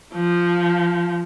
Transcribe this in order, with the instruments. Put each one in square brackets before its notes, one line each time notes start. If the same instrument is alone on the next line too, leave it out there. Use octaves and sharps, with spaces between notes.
[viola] F3